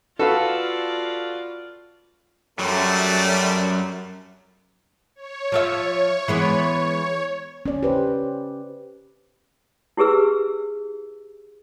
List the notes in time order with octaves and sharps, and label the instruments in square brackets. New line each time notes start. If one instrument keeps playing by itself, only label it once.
[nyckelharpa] F4 D5 [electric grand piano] F#4 B4 F5 [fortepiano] A4
[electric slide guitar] F#2 F#3 [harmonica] G3 A3
[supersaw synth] C#5
[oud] F3 F4 E5
E3 G#3 B3
[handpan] C#4 D5
G4 B4 C5
[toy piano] E4 G4 G#4 B4 E6